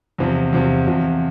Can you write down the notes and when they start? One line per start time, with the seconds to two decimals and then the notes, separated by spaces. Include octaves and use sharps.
0.18 E2 C3 F3
0.53 E2 C3 F3
0.87 E2 C3 F3